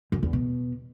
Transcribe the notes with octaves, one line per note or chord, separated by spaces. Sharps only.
F#2
E2
B2